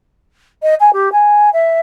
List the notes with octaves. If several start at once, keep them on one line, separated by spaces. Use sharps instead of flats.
D#5
G#5
G4
G#5
E5